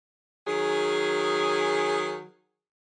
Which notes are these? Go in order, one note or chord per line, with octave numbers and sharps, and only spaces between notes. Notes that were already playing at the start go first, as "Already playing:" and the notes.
D#3 F#3 G#4